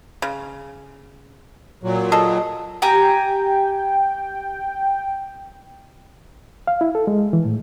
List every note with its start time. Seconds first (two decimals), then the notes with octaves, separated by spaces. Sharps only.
0.22 C#3
1.83 A#2 F#3
2.12 G#4 A4 D#5
2.82 G4 G5 G#5 A#5
6.67 F5
6.81 E4
6.95 A4
7.07 G#3
7.33 E3
7.45 A2